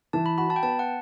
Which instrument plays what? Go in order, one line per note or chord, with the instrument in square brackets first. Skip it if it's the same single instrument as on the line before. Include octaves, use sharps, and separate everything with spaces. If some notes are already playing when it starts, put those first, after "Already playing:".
[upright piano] E3 [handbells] A5
[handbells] B5
[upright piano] F#4 [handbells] B5
[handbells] A5
G5
[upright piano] B3 [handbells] A5
[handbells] F#5